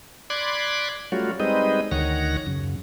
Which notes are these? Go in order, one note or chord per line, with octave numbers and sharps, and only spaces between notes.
D5 B5 C6 D6 F#6 G#6
F#3 G3 A3 C#4 F4 F#4
G3 G#3 C4 D#4 B4 D#5
D2 D#3 C#5 F#5 A#6
F#2 C#3